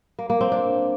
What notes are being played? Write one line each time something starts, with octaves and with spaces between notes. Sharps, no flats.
A#3
A#3
C4
D4